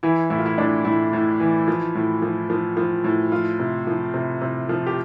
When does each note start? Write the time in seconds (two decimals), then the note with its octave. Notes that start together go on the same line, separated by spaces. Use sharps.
0.03 E3 E4
0.30 A2 E4
0.38 F4
0.46 E4
0.58 A2 D4
0.85 A2 E4
1.13 A2
1.40 E3
1.68 F3
1.95 A2
2.22 F3
2.50 F3
2.77 F3
3.04 A2
3.32 F3 F4
3.59 C3
3.87 F3
4.14 C3
4.41 C3
4.69 F3
4.87 G4